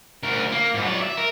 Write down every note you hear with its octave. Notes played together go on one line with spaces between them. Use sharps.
D2 A#4
A#3
G#2 B2
F#3 D5
E5
A#4